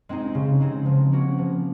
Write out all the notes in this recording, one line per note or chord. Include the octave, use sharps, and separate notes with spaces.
G#3 C4 D#4
C#3
G#3 C4 D#4
F3
A#3 C#4 F#4
F3